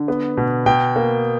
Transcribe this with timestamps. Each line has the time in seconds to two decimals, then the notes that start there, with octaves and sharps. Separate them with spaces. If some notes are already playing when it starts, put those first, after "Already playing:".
Already playing: D3
0.08 B3
0.37 B2
0.66 B2 G5
0.96 A#3